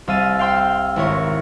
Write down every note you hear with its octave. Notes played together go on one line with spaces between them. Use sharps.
C2 F5 E6 A6 D#7
F5 G5 C6 E6
G#1 E4 A#4 C#5